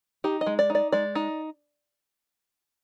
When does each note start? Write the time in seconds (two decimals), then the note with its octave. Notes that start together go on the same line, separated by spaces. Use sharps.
0.24 D#4 G4
0.41 D#5
0.47 G#3
0.59 D5
0.70 D#4
0.75 D5
0.92 G#3 D5
1.15 D#4